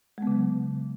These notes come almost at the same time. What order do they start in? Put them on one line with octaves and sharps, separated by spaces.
G#3 B3 C#3 F#3